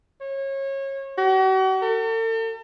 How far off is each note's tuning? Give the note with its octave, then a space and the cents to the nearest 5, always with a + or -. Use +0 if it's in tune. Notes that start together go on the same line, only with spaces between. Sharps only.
C#5 -25
F#4 +40
A4 +45